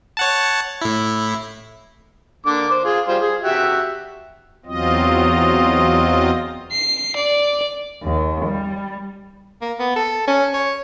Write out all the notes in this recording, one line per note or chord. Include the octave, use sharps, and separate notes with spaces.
C#5 F#5 A5
A2 E4
D3 A#3 D6
C5
F4 G#4
G3 F4 C5
G#4
F#4 G4 E5
E2 F#3 C4 F4 D#5
C7
D5
D#2
G3
A#3
B3
A4
C#4
C#5